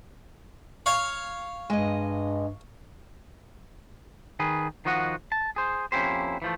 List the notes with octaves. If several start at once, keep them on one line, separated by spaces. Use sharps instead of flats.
C#5 F5 C#6
G2 G#3 D#5
D#3 G#4 B4
D#3 F3 F#4 D#5 F#5
A5
G#4 C5
F2 A#3 C#4 E4 G4 C5
E3 F3 A3